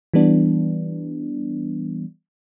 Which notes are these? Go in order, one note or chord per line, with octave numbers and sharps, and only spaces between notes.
E3 G3 B3 D4